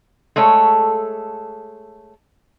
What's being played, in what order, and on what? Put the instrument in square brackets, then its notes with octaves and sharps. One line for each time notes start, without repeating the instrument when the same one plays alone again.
[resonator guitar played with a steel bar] G#3 A3 A4 C#5